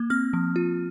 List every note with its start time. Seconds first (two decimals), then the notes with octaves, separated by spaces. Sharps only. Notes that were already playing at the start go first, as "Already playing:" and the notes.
Already playing: A#3
0.10 C4 F6
0.33 F3
0.56 F4